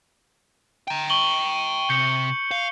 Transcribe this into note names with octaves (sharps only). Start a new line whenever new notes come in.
G5 A#5
C#6 F#7 G7
C3 G6 C#7
F5